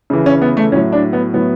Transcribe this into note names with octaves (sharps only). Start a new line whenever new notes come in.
C#3 E3
C#4
B3
A3
A2 F#3 C#4
D4
B3
A2 F#3 B3